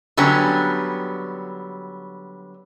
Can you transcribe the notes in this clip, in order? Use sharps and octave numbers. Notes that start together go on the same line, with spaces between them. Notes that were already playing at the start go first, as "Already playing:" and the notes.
D3 F#3 G3 B3 C#4